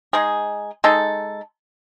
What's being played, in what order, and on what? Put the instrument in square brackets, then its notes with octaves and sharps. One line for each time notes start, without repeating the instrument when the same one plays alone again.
[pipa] G#3 D#4 G#4
G#3 D#4 A4